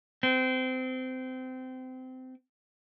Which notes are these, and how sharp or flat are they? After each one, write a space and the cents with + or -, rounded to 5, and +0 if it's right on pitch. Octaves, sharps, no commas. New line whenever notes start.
C4 -25